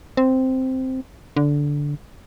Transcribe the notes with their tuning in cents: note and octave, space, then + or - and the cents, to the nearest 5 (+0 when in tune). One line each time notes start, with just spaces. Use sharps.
C4 -5
D3 -10